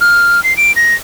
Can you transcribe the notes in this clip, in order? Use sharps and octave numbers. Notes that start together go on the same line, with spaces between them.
F6
C7
D7
A#6